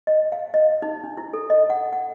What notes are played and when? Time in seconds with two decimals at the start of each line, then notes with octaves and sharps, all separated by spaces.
0.07 D#5
0.32 F5
0.54 D#5
0.82 D#4
1.04 D4
1.17 E4
1.33 A4
1.50 D#5
1.70 F#5
1.93 F#5